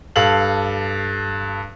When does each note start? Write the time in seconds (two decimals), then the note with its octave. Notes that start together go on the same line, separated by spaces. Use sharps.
0.16 G2 A4 F5 F#7